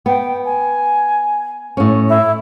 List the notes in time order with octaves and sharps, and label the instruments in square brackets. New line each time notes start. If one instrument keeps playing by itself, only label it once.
[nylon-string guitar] B3 [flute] G5
[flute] G#5
[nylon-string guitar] A2 C#4
[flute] E4